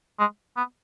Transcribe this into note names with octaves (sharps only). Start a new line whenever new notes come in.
G#3
B3